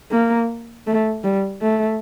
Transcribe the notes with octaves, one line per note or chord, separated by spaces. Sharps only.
A#3
A3
G3
A3